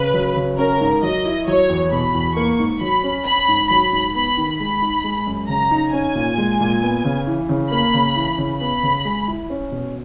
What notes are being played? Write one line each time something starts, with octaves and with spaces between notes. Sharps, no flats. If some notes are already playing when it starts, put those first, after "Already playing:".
Already playing: C#3 B4
F#3
C#3
C#4 A#4
G#2
F#3 D#5
E4
F#3 C#5
E2
B2 B5
E2
A#3 C#6
G#2
F#3 B5
C#4
C#4 B5
G#2
F#3 B5
G#2
B3 B5
D#3
G#3 B5
D#4
G#3
F#2
C#3 A#5
D#4
C#4 G#5
A#2
G#3
A#2
B3
C#3
E3
C#3
A#3 B5
C#3
E3
C#3
B3 B5
C#3
G#3
E4
C#4
B2